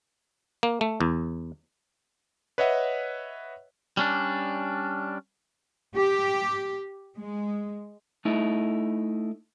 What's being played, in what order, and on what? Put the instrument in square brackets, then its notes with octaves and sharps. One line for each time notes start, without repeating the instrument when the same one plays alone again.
[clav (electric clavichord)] A#3
A3
E2
[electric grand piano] B4 C#5 D#5 E5 F#5
[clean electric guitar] G3 C#4 D4
[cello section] G4
G#3
[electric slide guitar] A3 D#4 E4